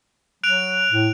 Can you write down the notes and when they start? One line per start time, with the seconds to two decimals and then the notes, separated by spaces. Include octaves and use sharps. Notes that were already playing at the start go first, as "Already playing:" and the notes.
0.43 F#3 F#6 D7 F7
0.91 A2